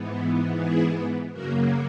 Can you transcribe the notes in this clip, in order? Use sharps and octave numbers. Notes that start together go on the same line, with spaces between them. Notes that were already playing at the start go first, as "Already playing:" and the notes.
Already playing: G#2 E3 B3
E4 G#4
F#2 C#3 F#3 A#3 F#4 A#4